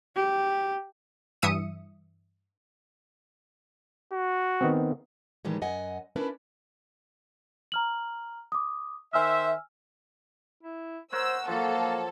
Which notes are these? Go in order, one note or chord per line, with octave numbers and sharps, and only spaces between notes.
G4
G2 E3 E5 D#6 C#7 D#7
F#4
D#3 B3 C4
A2 D#3 E3 G3 G#3
F#2 D#5 F#5 G#5
C#4 D4 E4 A#4 B4
A#5 F6 F#7
D6 D#6
D#3 C5 E5 G#5 E6 F6
E4
A#4 C5 C#5 F#5 E6
F3 F#3 A#3 A4 A5